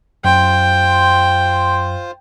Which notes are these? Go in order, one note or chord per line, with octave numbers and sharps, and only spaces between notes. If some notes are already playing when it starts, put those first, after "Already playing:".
F#2 F4 C5 G5